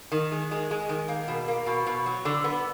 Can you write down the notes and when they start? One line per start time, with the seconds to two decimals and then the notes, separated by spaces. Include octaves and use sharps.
0.12 D#3
0.32 G#3
0.51 G#3
0.71 G#3
0.89 D#3
1.08 A#3
1.28 B2
1.48 A#3
1.66 B2
1.86 B2
2.06 F#3
2.25 D3
2.44 B3